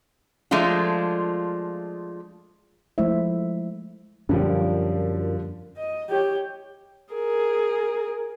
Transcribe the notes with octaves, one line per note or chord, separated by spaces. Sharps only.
F3 G#3 A3 D4 F4
F3 G#3 A3 E4 C5 E5
F#2 A#2 D3 F3 G3
D#5
G4 C#5
G#4 A#4